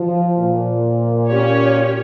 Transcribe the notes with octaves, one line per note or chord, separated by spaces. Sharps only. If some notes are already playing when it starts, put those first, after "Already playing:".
Already playing: F3
A#2
C#4 G4 C#5